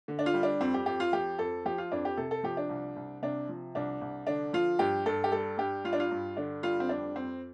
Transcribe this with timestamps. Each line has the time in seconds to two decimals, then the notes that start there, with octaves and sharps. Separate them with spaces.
0.08 D3
0.19 D4
0.26 F4
0.34 G3
0.43 D4
0.61 F2 C4
0.74 G4
0.86 F2 G4
1.00 F4
1.13 F3 G4
1.38 F2 A4
1.65 F3 G4
1.78 F4
1.92 F2 D4
2.05 G4
2.17 C3 A4
2.31 A4
2.43 F3 G4
2.57 D4
2.69 C2
2.96 C2
3.22 C3 D4
3.49 F3
3.75 C2 D4
4.01 C2
4.27 D3 D4
4.53 F3 F4
4.79 G2 G4
5.06 G2 A4
5.24 G4
5.32 G3 A4
5.58 G2 G4
5.84 G3 F4
5.93 D4
6.00 F4
6.11 G2
6.37 D3 D4
6.63 G3 F4
6.80 C4
6.89 F2 D4
7.15 F2 C4